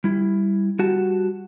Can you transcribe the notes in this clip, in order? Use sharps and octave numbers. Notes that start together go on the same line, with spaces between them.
G3 E4
G3 F#4 A5